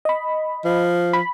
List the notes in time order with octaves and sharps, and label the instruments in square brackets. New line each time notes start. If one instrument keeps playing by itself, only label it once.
[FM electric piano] D#5 B5
[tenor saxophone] F3
[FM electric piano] B5